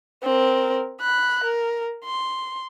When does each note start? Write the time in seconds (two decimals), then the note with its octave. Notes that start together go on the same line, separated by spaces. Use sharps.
0.23 C4 A#4
1.01 B5 F#6
1.44 A#4
2.05 C6